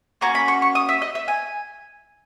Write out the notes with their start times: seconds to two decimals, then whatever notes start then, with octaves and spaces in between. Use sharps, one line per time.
0.21 A#3 C#4 F#4 A#5
0.35 B5
0.48 C#6
0.62 C#6
0.75 D#6
0.89 E5
1.02 D#5
1.15 E5
1.28 G#5